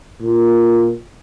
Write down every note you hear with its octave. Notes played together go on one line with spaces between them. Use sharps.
A#2